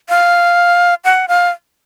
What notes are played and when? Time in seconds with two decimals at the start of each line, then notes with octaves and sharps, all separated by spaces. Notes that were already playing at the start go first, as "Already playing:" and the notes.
0.09 F5
1.05 F#5
1.28 F5